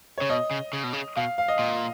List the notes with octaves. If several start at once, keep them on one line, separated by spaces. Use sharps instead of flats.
C#3 C#5
B2 D#5
C#3
C#3
B2
C#3
B2 F5
F5
D#5
A#2